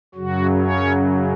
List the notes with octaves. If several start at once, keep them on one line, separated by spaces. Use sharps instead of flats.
F#2 C#3 F#3 F#4
C#4 C#5